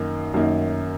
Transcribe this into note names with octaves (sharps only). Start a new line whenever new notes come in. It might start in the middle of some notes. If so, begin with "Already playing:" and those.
Already playing: F#2 D#3 A#3 D#4
F#2 D#3 A#3 D#4